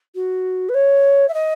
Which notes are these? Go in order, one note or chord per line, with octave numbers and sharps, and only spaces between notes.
F#4
B4
C#5
E5
D#5